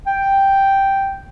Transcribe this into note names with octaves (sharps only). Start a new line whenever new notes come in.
G5